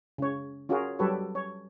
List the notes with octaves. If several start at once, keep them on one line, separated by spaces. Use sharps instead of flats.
C#3 C#5
C#4 F4 F#4 G#4 A#4
F#3 G3 G4 A4 B4 C#5
C#5